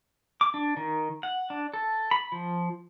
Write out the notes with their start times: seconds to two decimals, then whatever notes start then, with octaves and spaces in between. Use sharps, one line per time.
0.41 D6
0.54 D4
0.77 D#3
1.23 F#5
1.50 D4
1.74 A4
2.11 B5
2.32 F3